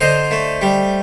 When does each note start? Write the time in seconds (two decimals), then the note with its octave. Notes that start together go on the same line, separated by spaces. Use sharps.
0.01 D3 C5 D#5
0.31 A3
0.62 G3